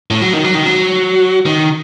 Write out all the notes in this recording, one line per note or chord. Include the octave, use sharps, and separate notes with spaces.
A2
F#3
D#3
F#3
D#3
F#3
D#3